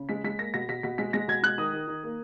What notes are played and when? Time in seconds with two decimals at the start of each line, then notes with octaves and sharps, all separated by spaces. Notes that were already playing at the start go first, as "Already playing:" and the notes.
Already playing: C#3
0.09 G#3 B6
0.24 G#3 B6
0.39 A#3 A#6
0.54 B2 A#6
0.69 B2 B6
0.83 B2 B6
0.98 G#3 B6
1.13 G#3 A#6
1.28 B2 G#6
1.43 G#3 F#6
1.58 D#3 D#6
1.73 D#3
1.88 D#3
2.04 A#3